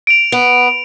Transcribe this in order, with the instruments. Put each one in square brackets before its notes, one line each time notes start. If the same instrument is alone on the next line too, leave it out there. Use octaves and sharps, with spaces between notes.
[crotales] D7 F7
[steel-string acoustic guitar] B3